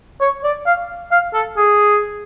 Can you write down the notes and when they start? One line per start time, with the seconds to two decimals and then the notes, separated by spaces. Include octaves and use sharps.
0.21 C#5
0.44 D5
0.66 F5
1.12 F5
1.34 A4
1.57 G#4